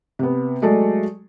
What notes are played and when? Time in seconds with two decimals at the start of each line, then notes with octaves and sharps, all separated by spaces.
0.19 C3 B3
0.62 F#3 G#3 A3 A4 D5